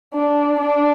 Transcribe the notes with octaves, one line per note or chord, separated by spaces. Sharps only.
D4
D4